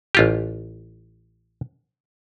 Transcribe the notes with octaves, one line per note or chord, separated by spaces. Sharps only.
A1 F4 G4